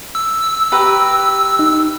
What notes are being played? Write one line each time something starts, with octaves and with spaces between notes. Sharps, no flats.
E6
G4 B4 A#5
D#4